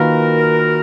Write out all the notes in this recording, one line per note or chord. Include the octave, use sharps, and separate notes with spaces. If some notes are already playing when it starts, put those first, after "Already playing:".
Already playing: D#3 A#3 F4 F#4 A#4 B4